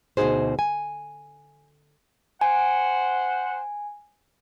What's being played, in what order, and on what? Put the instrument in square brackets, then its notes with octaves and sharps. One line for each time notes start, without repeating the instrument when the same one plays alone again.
[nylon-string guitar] D2 B2 F3 D#4 G#4 C5
G#5
[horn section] C5 F#5 [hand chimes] G#5